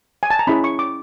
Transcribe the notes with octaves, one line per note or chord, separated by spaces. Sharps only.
G#5
A5
A#5
C#4 E4 G#4 C#5 B5
C#6
D6